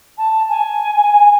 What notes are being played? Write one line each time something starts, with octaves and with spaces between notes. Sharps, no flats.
A5
G#5